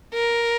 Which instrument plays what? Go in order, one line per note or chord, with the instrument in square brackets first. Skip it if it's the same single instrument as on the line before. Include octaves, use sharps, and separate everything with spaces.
[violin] A#4